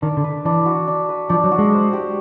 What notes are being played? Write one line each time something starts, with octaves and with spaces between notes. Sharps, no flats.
D#3 D4
D3
B4
E3 D4
F#4
D4
B4
F3 D4
F#3
F#4
G#3
C5
G4